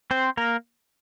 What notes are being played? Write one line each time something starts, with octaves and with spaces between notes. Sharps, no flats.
C4 C5
A#3 A#4